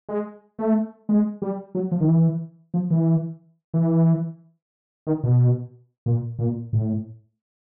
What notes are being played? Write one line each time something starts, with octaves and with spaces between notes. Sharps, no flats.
G#3
A3
G#3
G3
F#3
F3
D#3
E3
F3
E3
E3
D#3
B2
A#2
A#2
A2